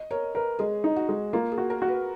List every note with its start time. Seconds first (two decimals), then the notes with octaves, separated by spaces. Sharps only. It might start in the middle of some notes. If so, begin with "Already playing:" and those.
Already playing: D#5
0.11 A#4 C#5
0.35 A#4 B4
0.59 G#3 G#4
0.84 D#4
0.96 F#4
1.09 G#3
1.33 A#3 F4
1.52 G#4
1.58 F#4
1.70 A#4
1.82 F#4
1.88 B4